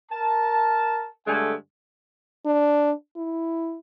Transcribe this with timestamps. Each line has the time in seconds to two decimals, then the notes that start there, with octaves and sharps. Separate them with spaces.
0.12 A#4 A5
1.27 G2 D3 G#3 A3 G#5
2.46 D4
3.17 E4